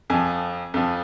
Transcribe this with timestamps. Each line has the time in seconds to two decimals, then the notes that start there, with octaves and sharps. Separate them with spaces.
0.10 F2 F3 G#5
0.74 F2 F3